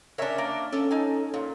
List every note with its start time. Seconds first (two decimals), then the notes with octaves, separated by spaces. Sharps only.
0.18 C#4 D4 A#4 C#5 E5
0.38 A#3
0.73 C#4 A4
0.91 D#4 G#5
1.34 A#2